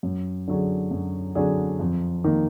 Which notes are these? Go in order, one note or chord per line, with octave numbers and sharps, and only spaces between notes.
F#2
D3 F#3 D4 G#4
F#2
D3 F#3 D4 G#4
F2
D#3 A#3